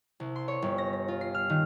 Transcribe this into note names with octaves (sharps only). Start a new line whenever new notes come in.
C2
C6
C#5
G1
A#6
A#6
F4
C7
F6
D#3